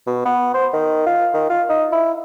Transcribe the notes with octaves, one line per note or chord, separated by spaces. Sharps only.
B2
B3
C5
D#3
F4
D#3
F4
D#4
E4